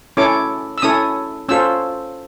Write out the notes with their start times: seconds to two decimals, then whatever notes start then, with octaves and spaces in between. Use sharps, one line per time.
0.17 C#4 E4 A4 C#5 D6
0.78 E6
0.82 C#4 E4 A4 C#5 D#6
1.49 C#4 F4 A4 C5 E6